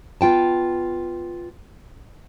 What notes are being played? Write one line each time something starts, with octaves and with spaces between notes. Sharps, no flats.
B3 F4 G5 A5